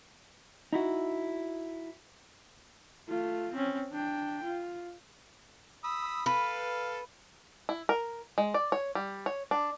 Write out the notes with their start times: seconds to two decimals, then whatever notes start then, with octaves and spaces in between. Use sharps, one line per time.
0.73 D#4 E4 F#4
3.09 A3 F4
3.53 C4 C#4
3.92 D4 G5
4.44 F4
5.84 B5 D#6 E6
6.26 A4 B4 F5
7.69 E4
7.89 A#4
8.38 G#3
8.54 D5
8.72 C#5
8.95 G3
9.26 C#5
9.51 D4